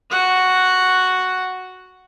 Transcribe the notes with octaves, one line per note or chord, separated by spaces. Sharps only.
F#4 F#5